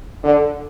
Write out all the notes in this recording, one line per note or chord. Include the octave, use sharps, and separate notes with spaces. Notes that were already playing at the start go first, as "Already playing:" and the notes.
D3